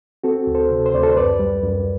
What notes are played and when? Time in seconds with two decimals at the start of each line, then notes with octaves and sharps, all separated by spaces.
0.24 C4 F#4 A4
0.47 D2
0.55 A4 C5
0.70 C3
0.86 C5
0.94 D2 D5
1.03 A4 C5
1.16 F#2 B4 D5
1.39 G3
1.63 F#2